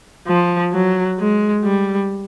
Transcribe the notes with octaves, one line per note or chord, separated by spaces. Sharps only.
F3
F#3
G#3
G3